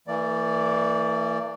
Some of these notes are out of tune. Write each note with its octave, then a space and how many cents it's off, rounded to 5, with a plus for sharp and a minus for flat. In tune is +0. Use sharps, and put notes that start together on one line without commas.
E3 +0 A#3 -45 D5 +0